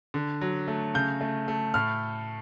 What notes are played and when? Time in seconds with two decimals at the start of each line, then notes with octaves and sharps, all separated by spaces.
0.14 D3
0.41 F#3
0.68 A3
0.94 C#3 G6
1.21 A3
1.48 A3
1.74 A2 F6